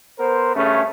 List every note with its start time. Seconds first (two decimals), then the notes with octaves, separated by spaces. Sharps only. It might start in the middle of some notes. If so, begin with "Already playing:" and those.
0.19 B3 A#4 C5
0.56 G2 C#3 A3 C#4